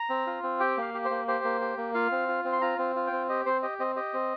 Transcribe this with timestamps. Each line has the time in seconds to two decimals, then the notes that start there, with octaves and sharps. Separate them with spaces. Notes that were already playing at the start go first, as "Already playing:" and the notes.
Already playing: A#5
0.10 C4
0.27 F4
0.43 C4
0.60 G4 G5
0.77 A#3 F5
0.94 G4
1.05 C5
1.10 A#3
1.28 G4 C5
1.44 A#3
1.61 G4
1.78 A#3
1.94 F4 F5
2.12 C4
2.28 F4
2.44 C4
2.52 C6
2.61 F4 A#5
2.79 C4
2.96 F4
3.07 G5
3.12 C4
3.29 G4 D#5
3.46 C4 C5
3.62 G4 D#5
3.80 C4 D#5
3.96 G4 D#5
4.14 C4